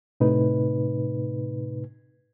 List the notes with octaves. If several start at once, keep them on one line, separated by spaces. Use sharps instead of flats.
A2 C3 D#4 B4